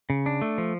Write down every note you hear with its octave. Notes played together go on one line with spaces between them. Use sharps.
C#3
D4
A3
F3